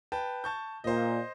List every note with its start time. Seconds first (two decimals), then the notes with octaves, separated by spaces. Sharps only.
0.12 B4 G5 A5
0.44 A5 C#6 G6
0.84 A#2 C5 D#5